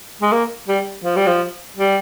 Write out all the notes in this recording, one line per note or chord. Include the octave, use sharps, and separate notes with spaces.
G#3
A#3
G3
F3
G3
F3
G3